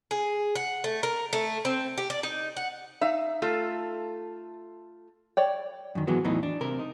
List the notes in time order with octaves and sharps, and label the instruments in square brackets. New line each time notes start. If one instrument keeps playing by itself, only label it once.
[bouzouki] G#4
F#5
A3
A#4
A3
C4
G4
D5
D#4
F#5
[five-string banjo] D#4 F5 [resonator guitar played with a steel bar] E5
[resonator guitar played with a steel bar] A3 F4 A4
[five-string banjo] C#5 D5 G5
[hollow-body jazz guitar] F#2 D#3
G#2 E3 F#3 G#3 B3 F#4
E2 A2 E3 F#3 D#4
D4
C3 A#4
D#4